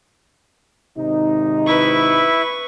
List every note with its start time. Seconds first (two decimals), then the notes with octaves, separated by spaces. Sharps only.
0.98 G#1 C3 D#4
1.67 E4 B4 E5 C#6